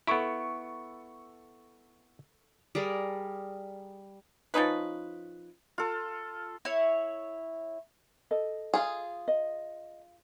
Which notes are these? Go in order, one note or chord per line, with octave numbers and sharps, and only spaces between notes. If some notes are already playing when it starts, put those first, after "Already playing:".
B3 E4 A4 C#6 D7
G3 G#4 A#4 D5
F3 C#4 D#4 B4
F4 A4
E4 C#5
A4 D#5
F4 G#4
D#5